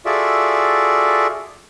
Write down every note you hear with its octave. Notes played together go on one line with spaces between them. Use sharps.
F4 F#4 G#4 A4 D5 E5